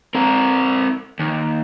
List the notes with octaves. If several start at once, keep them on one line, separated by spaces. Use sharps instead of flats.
C4 A#4
D#2